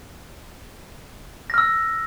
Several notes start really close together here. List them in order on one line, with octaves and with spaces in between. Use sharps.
A#6 F6 E6